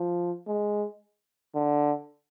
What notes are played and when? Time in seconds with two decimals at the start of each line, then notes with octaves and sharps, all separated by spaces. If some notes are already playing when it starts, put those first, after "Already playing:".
Already playing: F3
0.47 G#3
1.55 D3